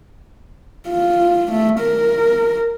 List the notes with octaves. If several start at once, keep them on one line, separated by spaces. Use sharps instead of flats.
F4
A3
A#4